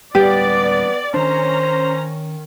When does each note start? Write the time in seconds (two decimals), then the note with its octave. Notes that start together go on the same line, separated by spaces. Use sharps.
0.15 D1 G3 B3 G4 D5
1.14 D#3 C#4 D4 C5 A#5